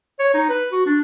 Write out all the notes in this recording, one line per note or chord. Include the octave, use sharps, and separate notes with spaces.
C#5
D#4
B4
F#4
D4